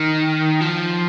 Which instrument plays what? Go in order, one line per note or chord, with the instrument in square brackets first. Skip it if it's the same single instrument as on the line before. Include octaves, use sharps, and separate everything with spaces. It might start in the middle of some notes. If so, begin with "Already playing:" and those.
Already playing: [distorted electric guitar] D#3
F3